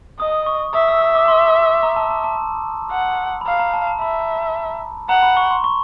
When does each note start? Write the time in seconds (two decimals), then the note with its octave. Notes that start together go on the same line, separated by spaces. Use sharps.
0.20 D#5 D#6
0.46 C#6
0.74 E5 D#6
0.88 E6
1.01 E6
1.15 D6
1.28 C6
1.83 A#5
1.96 A5
2.10 A5
2.24 A5
2.91 F#5
3.41 B5
3.46 F5 A#5
3.59 A#5
3.73 A5
3.87 A5
4.01 E5 B5
5.09 F#5 A#5
5.23 B5
5.37 C#6
5.51 C6
5.64 C#6